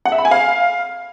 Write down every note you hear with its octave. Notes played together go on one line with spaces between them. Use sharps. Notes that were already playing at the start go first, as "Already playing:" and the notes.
F#5
E5
B5
G#5
F5